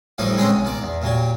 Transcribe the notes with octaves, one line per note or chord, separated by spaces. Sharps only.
A2 E3 F3 G3 D#4
G#3 C4 C#4 G#4 C5 E5
B1
D#3 D5
E2
A#2 F#3 G4